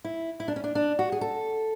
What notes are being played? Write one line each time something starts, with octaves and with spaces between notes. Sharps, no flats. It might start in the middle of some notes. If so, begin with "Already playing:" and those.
E4
E4
D4
C#4
D4
D4
F#4
G#4
A4